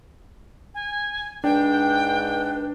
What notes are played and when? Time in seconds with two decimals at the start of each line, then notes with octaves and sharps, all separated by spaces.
0.75 G#5
1.44 G#2 D4 B4 G5